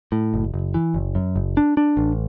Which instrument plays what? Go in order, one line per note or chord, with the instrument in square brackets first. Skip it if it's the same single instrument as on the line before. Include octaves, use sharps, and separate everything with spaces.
[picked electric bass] A2
F#1
F#1
E3
F#1
F#2
F#1
D4
D4
A1